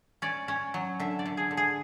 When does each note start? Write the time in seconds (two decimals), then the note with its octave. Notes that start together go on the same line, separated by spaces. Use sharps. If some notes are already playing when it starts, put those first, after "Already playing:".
0.22 C#4 D5
0.48 C#4
0.74 F#3
1.00 D3 E5
1.19 D5
1.26 D3
1.37 G#4
1.51 D3
1.57 G#4